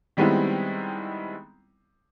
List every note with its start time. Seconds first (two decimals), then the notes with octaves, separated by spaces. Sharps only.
0.17 D#3 G3 G#3 B3 C4 E4